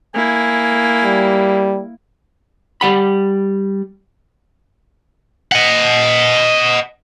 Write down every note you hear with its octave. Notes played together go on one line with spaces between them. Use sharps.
A#3 E4 G#5
G3
G3 F#5 B5
D#5 F#5